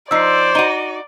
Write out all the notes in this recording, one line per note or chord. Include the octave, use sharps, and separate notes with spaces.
F3 D#4 C5 D5 E6 C7
D#4 F#4 D#7 G7